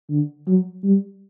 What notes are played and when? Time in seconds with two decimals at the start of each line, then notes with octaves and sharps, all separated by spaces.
0.10 D3
0.47 F#3
0.84 G3